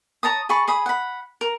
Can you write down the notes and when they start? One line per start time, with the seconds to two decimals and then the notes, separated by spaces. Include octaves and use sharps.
0.23 C#5 A5 A#5 D#6
0.49 G#4 A5 B5 C#6
0.68 G#4 B5 D#6
0.86 F#5 B5
1.41 A#4